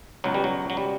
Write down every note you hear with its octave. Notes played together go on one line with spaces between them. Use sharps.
C#2 B2 F#3
G3
F#3
F#3
G3